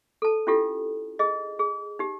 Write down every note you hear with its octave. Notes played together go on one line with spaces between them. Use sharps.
A4 A5
C#4 D4 E4 F4 G4 A4
G#4 D#5
G#4
D#4 G4